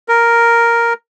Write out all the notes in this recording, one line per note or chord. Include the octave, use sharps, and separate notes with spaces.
A#4